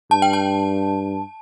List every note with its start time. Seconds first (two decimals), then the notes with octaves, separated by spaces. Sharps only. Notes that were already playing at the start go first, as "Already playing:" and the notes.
0.11 G2 A5
0.22 G5
0.33 A5